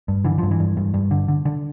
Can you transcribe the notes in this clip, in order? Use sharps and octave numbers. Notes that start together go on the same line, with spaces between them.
G2
D3 E3
G2 F3
E3
G2
G2
G2
D3
D3
D3